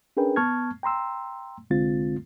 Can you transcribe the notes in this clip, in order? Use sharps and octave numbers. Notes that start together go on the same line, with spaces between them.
C#4 D4 G#4 A#4 B4 G5
B3 A5 C#6 F6 G#6
G5 A#5 C6 E6
C2 D3 G#3 C4 F4 A6